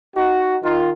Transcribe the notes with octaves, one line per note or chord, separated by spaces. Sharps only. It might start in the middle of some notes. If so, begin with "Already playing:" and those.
D#4 F#4
D#3 F4